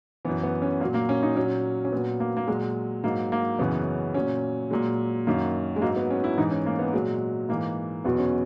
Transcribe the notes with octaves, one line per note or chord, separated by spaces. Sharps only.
F#2 E3 B3
B3
C#4
A#2 F#3 A#3
A#3
C#4
D#4
A#2 F#3 C#4
C#4
A#2 F#3 B3
A#3
A#3
A#2 F#3 G#3
G#2 F#3 A#3
A#3
F#2 C#3 E3 B3
A#2 F#3 C#4
A#2 F#3 G#3
F#2 D#3 F#3 A#3
G#3
G#2 F#3 A#3
B3
C#4
E4
G#2 E3 D#4
C#4
A#3
B3
A#2 F#3 G#3
G#2 E3 A#3
E2 B2 F#3 B3
C#4